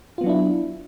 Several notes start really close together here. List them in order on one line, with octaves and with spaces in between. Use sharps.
F4 B3 F#3 D4 E4